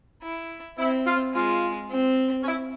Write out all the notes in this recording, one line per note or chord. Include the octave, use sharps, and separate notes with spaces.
E4
C4 E4
F4
G#3 F4
C4
C#4
E4